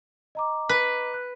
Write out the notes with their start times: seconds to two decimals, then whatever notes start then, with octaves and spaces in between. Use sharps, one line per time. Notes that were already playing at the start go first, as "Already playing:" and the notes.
0.35 D#5 A#5 D6
0.69 B4
1.14 F#6